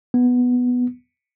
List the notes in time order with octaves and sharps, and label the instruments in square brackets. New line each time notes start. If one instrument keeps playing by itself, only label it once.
[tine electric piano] B3